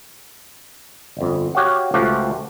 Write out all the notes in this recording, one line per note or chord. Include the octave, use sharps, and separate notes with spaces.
G1 F2
F#4 G4 C#5 F5 F#5
C#2 F3 A3 F#4 G4 F5